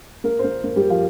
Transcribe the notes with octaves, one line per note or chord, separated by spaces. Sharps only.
A#3 A#4
C5
A#3 A#4
A#3 A#4
G3 G4
F3 F4